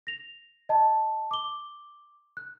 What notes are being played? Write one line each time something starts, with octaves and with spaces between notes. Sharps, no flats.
A#6 F7
D#5 A5
D6 G7
F#6